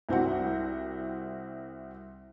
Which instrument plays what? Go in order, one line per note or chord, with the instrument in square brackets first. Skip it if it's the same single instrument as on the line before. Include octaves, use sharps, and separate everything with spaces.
[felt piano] C2 C4 F#4 F#5